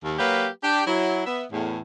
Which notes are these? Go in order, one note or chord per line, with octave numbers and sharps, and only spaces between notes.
D#2
F#3 A#3 G4 B4
D4 G4
F#3 E4
B3 E5
E2 A2